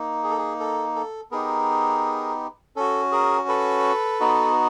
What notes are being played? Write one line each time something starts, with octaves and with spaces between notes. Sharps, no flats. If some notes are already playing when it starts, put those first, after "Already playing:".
Already playing: A#3 D#4
G#4
A4
G#4
A4
A4
B3 D#4 G4 G#4 A#4
C#4 F#4 A4
G#4 A#4
A4 B4
B3 D#4 F#4